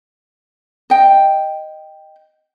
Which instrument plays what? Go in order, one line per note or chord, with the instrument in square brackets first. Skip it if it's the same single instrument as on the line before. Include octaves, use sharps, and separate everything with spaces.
[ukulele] D#5 G5